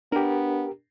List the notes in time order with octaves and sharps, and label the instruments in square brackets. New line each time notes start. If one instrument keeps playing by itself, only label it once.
[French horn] B3 [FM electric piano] D4 [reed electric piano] G4 A#4